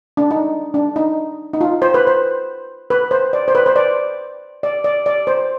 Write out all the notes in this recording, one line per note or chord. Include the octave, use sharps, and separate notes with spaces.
D4
D#4
D4
D#4
D#4
F4
C5
B4
C5
B4
C5
D5
C5
B4
C5
D5
D5
D5
D5
C5